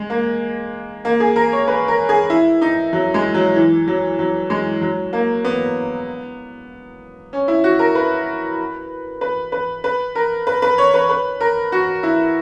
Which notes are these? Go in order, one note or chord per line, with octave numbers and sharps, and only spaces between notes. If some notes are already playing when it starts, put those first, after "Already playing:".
Already playing: G#3
A#3
A#3
G#4
A#4
C#5
B4
A#4
G#4
E4
D#4
F#3
G#3
F#3
E3
F#3
F#3
G#3
F#3
A#3
B3
C#4
E4
F#4
A#4
B4
B4
B4
B4
A#4
B4
B4
C#5
B4
B4
A#4
F#4
E4